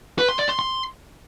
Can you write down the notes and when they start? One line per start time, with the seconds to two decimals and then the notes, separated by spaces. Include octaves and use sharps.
0.19 B4
0.29 C6
0.39 D5
0.49 C6
0.59 C6